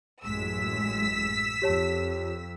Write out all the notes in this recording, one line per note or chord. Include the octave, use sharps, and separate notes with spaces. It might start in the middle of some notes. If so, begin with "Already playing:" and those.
A1 F#2 G#3 E6 B6
F2 G4 C#5 A5